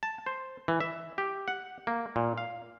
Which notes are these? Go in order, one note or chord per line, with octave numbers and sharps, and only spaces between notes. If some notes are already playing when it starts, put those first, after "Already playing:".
A5
C5
E3
E5
G4
F#5
A#3
A#2
F5